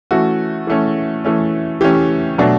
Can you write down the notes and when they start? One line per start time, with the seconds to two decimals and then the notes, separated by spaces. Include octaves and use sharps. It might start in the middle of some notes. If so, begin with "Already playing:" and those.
0.11 E3 A3 C#4 F#4
0.67 E3 A3 C#4
1.25 E3 A3 C#4
1.81 E3 A3 C#4 G4
2.38 B2 F#3 A3 D4